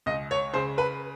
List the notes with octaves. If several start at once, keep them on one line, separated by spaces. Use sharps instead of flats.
C#2 D#5
C#5
C#3 C5
B4